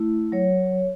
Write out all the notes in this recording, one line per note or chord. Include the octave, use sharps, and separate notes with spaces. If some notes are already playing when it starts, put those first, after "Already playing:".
Already playing: A3 E4
F#3 C#5